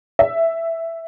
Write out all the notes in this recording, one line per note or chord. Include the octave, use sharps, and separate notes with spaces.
E5